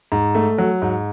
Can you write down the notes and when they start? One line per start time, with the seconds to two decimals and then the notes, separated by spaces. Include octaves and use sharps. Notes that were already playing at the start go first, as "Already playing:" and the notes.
0.12 G#2
0.35 A3
0.58 F#3
0.82 G#2